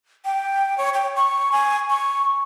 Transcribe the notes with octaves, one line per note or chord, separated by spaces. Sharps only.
G5
C#5
G5
C#6
G#5
C#6